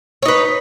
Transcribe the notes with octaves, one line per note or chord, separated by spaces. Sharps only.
D#4 B4 C#5